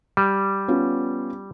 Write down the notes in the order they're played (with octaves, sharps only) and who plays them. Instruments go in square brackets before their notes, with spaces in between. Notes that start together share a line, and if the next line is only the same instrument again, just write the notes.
[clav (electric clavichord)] G3
[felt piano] B3 C#4 F4